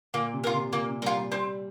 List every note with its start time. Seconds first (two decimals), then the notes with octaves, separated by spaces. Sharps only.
0.14 A#2 A#3
0.33 C3
0.44 F4 A#4
0.53 C3
0.73 A#2 A#3
0.87 C3
1.02 G3 F4 A#4
1.16 G3
1.32 G3 C4